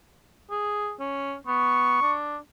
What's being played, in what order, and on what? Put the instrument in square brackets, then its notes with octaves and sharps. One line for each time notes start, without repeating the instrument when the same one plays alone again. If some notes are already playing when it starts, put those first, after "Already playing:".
[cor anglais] G#4
C#4
[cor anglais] B3 [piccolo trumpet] C#6
[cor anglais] D4